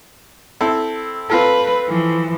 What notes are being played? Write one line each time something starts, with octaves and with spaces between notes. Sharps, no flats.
C4 E4 A4
C4 F4 A4 B4
E3 F3